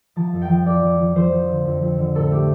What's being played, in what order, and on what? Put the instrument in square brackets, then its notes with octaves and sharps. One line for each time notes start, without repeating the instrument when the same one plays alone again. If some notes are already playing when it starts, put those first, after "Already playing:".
[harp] F3 A5
F2
G5
F3
F2 D5
F2
F3
F3 C5
F3
D3
F2
F2
D3
A2 A4
A3 G4